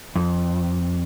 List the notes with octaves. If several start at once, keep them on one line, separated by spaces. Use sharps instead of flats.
F2